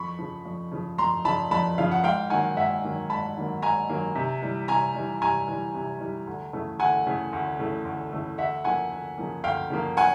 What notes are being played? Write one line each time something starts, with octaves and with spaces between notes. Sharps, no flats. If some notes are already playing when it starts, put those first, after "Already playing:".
Already playing: F2 B5 C#6
C#3 F3
F2
C#3 F3
F2 A#5 C6
C#3 F3 A5 B5
F2 A5 B5
C#3 F3 F5
F#5
G#2 F5 G5
D#3 F#3 A#3 F#5 G#5
G#2 E5 F#5
D#3 F#3 A#3
G#2 A5 B5
D#3 F#3 A#3
G#2 G#5 A#5
D#3 F#3 A#3
C3
E3 G3
C3 G#5 A#5
E3 G3
C3 G#5 A#5
E3 G3
C3
E3 G3
D2
C#3 E3 A3
D2 F#5 G#5
C#3 E3 A3
D2
C#3 E3 A3
D2
C#3 E3 A3
D2 E5 F#5
C#3 F3 A#3 F#5 G#5
D2
C#3 F3 A#3
D2 F5 G5
C#3 F3 A#3
F#5 G#5